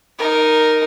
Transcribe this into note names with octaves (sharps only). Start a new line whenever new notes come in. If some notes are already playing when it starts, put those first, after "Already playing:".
D#4 A#4